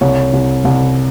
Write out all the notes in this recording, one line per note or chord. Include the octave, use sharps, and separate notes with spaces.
C2 C#5
C2
C2